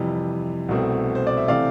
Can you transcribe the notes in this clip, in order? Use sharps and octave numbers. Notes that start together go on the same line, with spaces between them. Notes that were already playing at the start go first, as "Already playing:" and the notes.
Already playing: F2 C3 E3 G3
C2 B2 A3 C4
C5
D5
E5
C3 E3 A3 C4 D5 F5